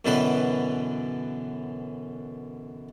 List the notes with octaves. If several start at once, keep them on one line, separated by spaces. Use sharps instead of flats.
F#2 B2 D3 E3 B4 G5